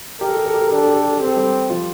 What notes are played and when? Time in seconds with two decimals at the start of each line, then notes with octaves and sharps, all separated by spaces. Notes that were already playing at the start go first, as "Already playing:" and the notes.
0.21 G4 A#4
0.29 A4
0.37 G4
0.46 A4
0.54 G4
0.62 A4
0.70 D4 G4
0.78 A4
0.87 G4
0.94 A4
1.02 G4
1.11 A4
1.19 C4 G4
1.27 A4
1.36 G3 G4
1.70 F3 F4